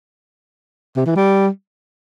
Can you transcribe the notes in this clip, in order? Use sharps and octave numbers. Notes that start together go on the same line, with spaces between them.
C3
E3
G3